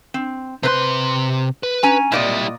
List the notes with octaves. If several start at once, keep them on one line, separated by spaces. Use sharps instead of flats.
C4
C3 B4 C5 C6
B4
C#4 G#5 A#5
A#2 G3 E4 D5 D#5